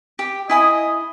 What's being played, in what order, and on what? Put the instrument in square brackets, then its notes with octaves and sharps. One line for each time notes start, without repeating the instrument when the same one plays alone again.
[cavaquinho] G4
[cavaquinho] E4 G#5 D#6 [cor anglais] D#5